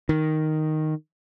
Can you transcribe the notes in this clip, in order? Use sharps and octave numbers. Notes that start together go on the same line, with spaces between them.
D#3